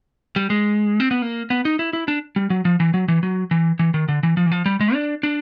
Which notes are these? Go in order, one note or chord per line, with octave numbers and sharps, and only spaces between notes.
G3
G#3
C4
B3
A#3
B3
D#4
E4
E4
D4
G3
F#3
F3
E3
F#3
E3
F#3
E3
E3
D#3
D3
E3
F3
E3
F3
G3
G#3
D4
D4